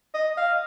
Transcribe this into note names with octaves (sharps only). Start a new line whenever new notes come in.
D#5
F5